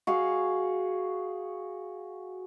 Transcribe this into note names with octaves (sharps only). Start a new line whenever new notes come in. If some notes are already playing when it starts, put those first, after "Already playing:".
F#4 G#4 F5